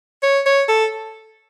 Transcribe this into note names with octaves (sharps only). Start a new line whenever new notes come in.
C#5
C#5
A4